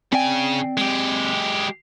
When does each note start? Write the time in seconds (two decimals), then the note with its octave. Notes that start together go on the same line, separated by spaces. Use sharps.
0.13 C#3 C4 D5 G5 G#5
0.77 G#3 G4